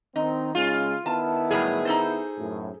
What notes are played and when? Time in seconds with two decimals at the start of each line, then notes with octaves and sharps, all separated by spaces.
0.16 D#3 C4 D#4
0.55 C#3 G#3 C#4 F4
1.06 D#3 B3 E4 A5
1.51 A2 F#3 G3 G#4
1.86 D#4 A4 C5
2.38 F#2 A2